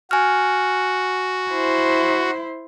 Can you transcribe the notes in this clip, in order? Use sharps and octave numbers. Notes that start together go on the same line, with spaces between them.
F#4 G#5 F6
E4 C5